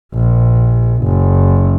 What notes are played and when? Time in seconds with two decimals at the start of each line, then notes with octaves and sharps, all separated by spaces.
0.14 A#1
1.04 F#1